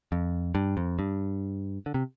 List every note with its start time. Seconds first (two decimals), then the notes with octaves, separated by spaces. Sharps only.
0.12 F2
0.55 G2
0.77 F2
0.99 G2
1.86 D3
1.94 C3